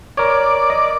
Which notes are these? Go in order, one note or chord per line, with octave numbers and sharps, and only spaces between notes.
A#4 C#5 D5
D#5